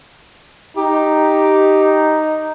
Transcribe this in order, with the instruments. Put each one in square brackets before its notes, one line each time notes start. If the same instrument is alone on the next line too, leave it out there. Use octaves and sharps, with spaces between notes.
[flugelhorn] D#4 [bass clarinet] G4